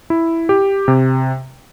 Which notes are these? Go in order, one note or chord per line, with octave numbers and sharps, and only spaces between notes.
E4
G4
C3